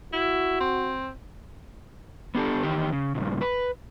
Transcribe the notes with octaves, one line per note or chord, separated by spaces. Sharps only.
E4 F#4
C4
B3 D4 G4 A4
E2 D#3 G4
C#3
G2 A#2 C#3
B4